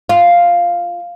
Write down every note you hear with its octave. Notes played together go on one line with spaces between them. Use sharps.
F4